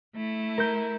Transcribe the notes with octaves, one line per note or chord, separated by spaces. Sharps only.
A3 E4
A#4 G6